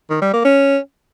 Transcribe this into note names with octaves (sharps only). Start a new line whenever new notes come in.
D#3
G3
A#3
C#4